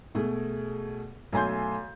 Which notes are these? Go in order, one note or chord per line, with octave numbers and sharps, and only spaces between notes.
B2 A3 G#4
B1 A3 G#5 C6 G6